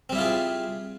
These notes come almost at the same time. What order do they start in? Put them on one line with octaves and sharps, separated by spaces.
C4 G3 E4 F4 G#4